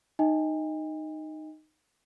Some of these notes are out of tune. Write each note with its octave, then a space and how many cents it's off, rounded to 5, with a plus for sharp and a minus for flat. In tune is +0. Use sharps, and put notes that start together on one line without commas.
D#4 -10 D#5 +20 G#5 -45